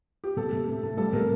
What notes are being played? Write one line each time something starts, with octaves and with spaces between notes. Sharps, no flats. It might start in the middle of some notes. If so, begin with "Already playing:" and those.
G4
C3 A4
C3
A3
A3
G3 A4
C3 A#4